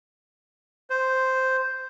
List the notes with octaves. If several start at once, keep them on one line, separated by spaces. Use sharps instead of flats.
C5